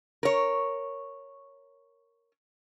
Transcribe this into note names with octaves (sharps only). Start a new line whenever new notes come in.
A#4 C#5